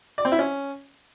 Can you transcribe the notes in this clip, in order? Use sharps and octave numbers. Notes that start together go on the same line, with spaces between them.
D5
C4
E4
C#4